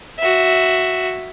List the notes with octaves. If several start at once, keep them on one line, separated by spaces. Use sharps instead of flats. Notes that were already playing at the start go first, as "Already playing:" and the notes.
F#4 E5